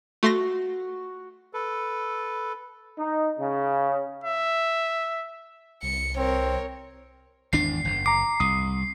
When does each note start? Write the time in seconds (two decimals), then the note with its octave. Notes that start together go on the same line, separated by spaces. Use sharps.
0.23 A3 F#4 C6 A#6
1.53 A4 B4
2.99 D#4
3.39 C#3
4.24 E5
5.83 C2 C#7
6.17 C4 A#4 C#5
7.53 G#1 E2 D4 C7
7.84 F#1
8.06 A#5 D6 C7
8.40 C2 D#6